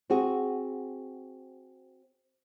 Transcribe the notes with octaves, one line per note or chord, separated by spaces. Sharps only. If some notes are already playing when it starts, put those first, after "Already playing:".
C4 F#4 G#4